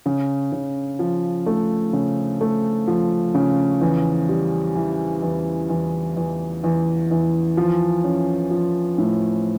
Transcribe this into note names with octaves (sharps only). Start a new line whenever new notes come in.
C#3
C#3
F3
A3
C#3
A3
F3
C#3
E2
G3
E3
E2
E2
E2
E2
E2
F3
C#4
F3
A2